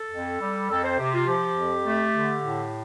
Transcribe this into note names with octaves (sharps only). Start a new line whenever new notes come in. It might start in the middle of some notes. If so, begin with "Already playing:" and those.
Already playing: A4
F2
G3
F2 A4
C5
C3 G4
F4
F3 G4
F2
A3
D3
A2